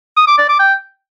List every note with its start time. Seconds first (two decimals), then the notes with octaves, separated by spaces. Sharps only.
0.17 D#6
0.27 D6
0.38 D5
0.49 D6
0.60 G5